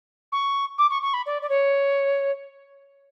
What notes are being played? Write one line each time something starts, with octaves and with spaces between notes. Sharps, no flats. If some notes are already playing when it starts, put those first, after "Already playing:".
C#6
D6
C#6
C#6
B5
D5
D5
C#5